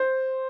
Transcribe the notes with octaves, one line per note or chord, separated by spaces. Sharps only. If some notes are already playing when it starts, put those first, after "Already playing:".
Already playing: C5